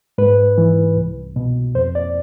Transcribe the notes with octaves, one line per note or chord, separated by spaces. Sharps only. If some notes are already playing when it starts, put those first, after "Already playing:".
G#2 B4
E3
C2
B2
F2 C5
D5